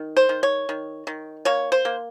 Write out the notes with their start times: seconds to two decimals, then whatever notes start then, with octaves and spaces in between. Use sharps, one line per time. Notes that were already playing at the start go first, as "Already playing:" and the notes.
Already playing: D#3
0.17 C5
0.29 D#3
0.43 C#5
0.69 D#3
1.07 D#3
1.45 A#3 C#5
1.72 C5
1.85 A#3